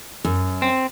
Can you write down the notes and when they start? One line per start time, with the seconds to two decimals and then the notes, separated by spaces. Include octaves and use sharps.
0.25 F#2
0.62 C4